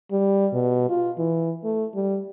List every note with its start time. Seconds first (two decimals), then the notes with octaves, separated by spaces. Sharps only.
0.12 G3
0.53 B2
0.89 F4
1.18 E3
1.64 A3
1.95 G3